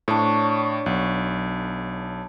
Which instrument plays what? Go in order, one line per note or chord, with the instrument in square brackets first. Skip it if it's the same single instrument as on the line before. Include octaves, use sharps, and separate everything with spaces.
[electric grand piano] A2 [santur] D4 C#5
[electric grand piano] B1 [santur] F#5